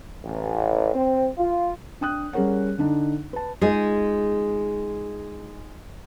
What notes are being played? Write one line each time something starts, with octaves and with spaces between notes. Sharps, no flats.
A1
C4
F4
D4 G5 D#6 F#6
G3 C#4 G#4 A#4 C#5 F#5
D3 D4 D#4
B4 A5
G#3 D#4 F4 G#4